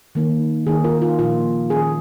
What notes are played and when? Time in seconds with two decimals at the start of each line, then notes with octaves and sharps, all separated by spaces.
0.15 D#3 A#3 D#4
0.67 D#3 A#3 D#4 G#4
0.84 F4 A#4
1.02 F4
1.19 A#2 F3 A#3 F4
1.70 D#3 G#3 C#4 G#4